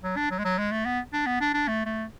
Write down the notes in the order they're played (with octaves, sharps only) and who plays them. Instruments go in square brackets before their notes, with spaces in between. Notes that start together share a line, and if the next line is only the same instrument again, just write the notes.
[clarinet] F#3
D4
F#3
G#3
F#3
G#3
A3
B3
D4
B3
D4
D4
A3
A3